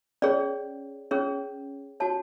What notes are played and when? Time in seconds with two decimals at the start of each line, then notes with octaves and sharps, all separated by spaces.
0.22 C#4 G#4 C#5 D5
1.11 C#4 G#4 C#5
2.00 F#4 C#5 A5